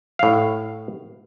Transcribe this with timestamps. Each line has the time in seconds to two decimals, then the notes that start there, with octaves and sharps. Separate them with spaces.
0.19 A2 F5